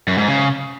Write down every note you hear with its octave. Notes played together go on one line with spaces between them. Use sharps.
F#2
G#2
C#3